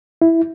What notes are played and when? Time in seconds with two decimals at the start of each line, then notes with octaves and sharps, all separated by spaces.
0.22 E4